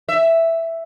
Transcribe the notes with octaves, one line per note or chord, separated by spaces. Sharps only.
E5